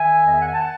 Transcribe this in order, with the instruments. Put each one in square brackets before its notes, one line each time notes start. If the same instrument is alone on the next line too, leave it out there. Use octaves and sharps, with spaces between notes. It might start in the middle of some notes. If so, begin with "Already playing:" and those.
Already playing: [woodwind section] D#3 E5 G#5
E2 D#5
E5
F#5
G#5
F#5 A5